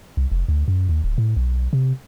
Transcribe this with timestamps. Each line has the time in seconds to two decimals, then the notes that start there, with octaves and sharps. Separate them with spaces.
0.17 C2
0.32 F1
0.48 D2
0.68 F#2
0.89 D#2
1.04 D1
1.18 A2
1.37 B1
1.73 C3